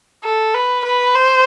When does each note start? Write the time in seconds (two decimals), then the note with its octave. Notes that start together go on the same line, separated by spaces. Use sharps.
0.23 A4
0.54 B4
0.85 B4
1.15 C5